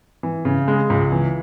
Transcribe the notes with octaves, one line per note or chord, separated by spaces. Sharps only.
E3
C#3
G#3
C#2
E3